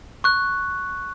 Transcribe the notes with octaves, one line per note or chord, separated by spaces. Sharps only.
C#6 F#6